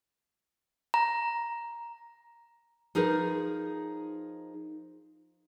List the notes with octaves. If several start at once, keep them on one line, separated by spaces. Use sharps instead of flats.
A#5
F3 D#4 G#4 A#4 B4